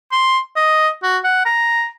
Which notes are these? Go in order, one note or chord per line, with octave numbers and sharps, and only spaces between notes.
C6
D#5
F#4
F#5
A#5